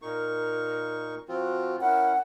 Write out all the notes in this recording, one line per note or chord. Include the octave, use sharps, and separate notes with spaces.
A#2 D#4 A#4 C#6
F3 C4 F4 F#4
C#4 E4 A#4 F#5